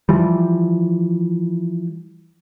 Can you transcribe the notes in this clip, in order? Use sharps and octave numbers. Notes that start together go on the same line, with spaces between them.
E3 F3 G3